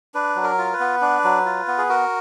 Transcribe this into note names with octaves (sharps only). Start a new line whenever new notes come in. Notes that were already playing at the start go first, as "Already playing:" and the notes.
D4 B4
F#3
A#4
F4
B4
B3
D4
F#3
F4
B3
G#4
F#4 A#4